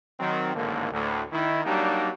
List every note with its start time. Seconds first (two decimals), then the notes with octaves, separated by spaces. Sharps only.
0.20 D#3 F#3 C4
0.55 A1 G#2 D3 D#3 A#3
0.92 D2 A2
1.32 D#3 D#4 E4
1.65 F#3 G3 A#3 D4 D#4 G4